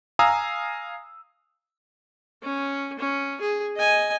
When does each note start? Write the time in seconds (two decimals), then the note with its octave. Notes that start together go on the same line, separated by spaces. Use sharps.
0.19 F5 G#5 A#5 D#6 E6
2.42 C#4
2.99 C#4
3.41 G#4
3.76 D#5 G#5